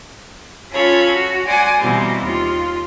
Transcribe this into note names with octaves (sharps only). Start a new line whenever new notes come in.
C#4 F4 A4 C#5 B5
F#4
D5 F#5 G#5 C6 D6
B2 E3 G3 A#3 C4
D#2 F4